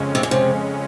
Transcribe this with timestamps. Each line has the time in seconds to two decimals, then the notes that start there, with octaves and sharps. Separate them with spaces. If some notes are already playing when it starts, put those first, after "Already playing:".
Already playing: F2 C#3 G#3 C#4
0.15 C3
0.23 A#2
0.31 C3